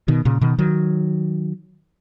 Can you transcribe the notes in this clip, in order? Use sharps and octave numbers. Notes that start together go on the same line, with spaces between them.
B2 D#3
A#2 C#3
B2 D#3
D#3 F#3